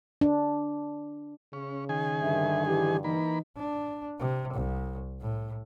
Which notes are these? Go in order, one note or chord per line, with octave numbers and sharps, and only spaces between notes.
D4
C#3 C#4
D#3 G#4 G#5
G2 D3 E5
E3 G4
E3 A#3 D#4 B5
D4
C3
C2
A2